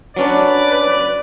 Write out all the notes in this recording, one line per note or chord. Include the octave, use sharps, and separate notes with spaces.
F#3 C#4 D4 B4 D5